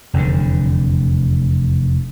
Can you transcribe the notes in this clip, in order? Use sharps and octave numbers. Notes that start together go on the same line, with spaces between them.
F1 E2 A#2 D3